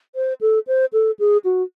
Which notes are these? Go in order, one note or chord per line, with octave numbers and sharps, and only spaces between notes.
C5
A4
C5
A4
G#4
F#4